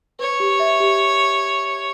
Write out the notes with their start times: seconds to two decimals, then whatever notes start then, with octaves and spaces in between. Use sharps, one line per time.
0.19 B4 C#5
0.40 G4
0.60 E5
0.80 G4